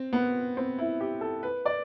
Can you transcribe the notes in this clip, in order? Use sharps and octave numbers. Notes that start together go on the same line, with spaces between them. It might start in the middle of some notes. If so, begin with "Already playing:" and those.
Already playing: C4
B3
C4
E4
G4
A4
B4
D5